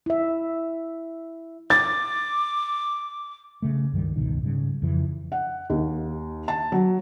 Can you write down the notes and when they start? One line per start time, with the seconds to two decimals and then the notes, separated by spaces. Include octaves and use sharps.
0.06 E4 E5
1.70 D6 A6
3.62 C#3 A3
3.92 C#2 G2 D#3 G3
4.16 G1 C#2 B2 D#3
4.42 G#2 C#3 G3
4.82 F2 C#3 E3
5.32 F#5
5.70 D#2
6.48 A5
6.72 F#3